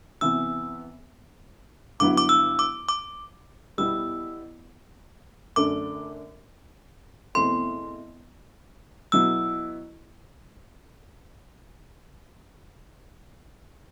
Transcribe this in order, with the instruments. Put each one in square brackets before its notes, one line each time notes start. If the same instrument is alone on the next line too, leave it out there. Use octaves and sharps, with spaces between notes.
[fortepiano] C3 E3 B3 [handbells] E6
[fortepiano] G2 D3 F#3 B3 E4 [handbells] D6
[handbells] D6
E6
D6
D6
[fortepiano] B2 G3 B3 E4 [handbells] E6
[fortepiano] F#2 D3 A3 D4 [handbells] D6
[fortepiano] E2 B2 A3 C4 E4 [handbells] C6
[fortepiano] B2 F#3 B3 E4 [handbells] E6